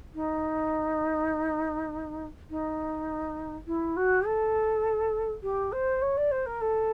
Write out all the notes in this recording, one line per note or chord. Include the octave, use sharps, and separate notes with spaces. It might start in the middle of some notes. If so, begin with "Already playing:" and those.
D#4
D#4
E4
F#4
A4
G4
C5
C#5
D5
C5
A#4
A4